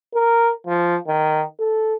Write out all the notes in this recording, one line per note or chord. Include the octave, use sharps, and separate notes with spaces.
A#4
F3
D#3
A4